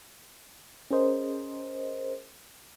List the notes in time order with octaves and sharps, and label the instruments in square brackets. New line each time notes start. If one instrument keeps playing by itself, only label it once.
[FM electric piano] C#4 G#4 A#4 C5 D#5